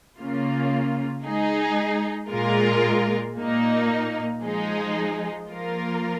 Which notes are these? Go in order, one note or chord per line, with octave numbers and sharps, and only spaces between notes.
C#3 A#3 F4
G#3 D#4 G#4
A#2 G#3 F4 A#4
A#2 A#3 D#4
F3 G#3 D#4 G#4
F3 A#3 F4 A#4